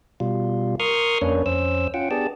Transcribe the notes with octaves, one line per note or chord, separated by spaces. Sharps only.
B2 G3 F4
A#4 C6 C#6 D#6 F6
F2 A#3 C#4 D4 B4 C#5
F2 C#4 C5 E6
C#4 F4 F#5 G5
B3 D4 G4 G#4 A5